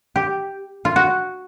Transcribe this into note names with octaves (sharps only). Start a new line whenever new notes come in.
G4
F4
F#4